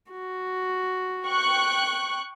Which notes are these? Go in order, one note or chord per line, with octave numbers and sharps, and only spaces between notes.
F#4
G5 C#6 F#6